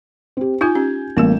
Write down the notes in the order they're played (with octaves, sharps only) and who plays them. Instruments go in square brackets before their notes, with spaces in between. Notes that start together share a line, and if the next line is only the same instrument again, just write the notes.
[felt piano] C4 G4
[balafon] D#4 F4 [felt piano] G#5 G6 G#6
[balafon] C#4 G4
[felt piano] A1 A#3 E7 [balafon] G3 B3